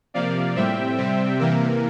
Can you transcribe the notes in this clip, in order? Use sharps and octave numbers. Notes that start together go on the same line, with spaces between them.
C3 F3 A#3 D5 F5
A2 G3 C4 E5 G5
C3 G3 C4
C3 E3 A#3 A#4